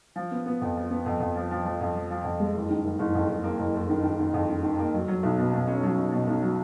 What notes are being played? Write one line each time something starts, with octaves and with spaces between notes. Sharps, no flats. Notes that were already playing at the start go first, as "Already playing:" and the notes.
F3
B3
B3
F2
F3
B3
F2
F2
F3
F3
F3
F2
F3
F3
F2
G#3
F#1
D#3
F#1
F#1
F2
F#1
A#3
F#1
F#1
D#3
D#3
D#3
F2
D#3
D#3
A#3
F#3
F#3
B1
B2
B2
C#4
F#3
C#4
B2
B1
F#3